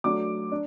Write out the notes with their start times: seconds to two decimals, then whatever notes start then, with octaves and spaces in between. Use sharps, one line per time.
0.04 F#3 A3 D4 D6
0.52 D4